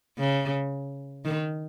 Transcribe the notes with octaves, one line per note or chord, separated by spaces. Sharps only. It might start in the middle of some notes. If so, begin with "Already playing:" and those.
C#3
D#3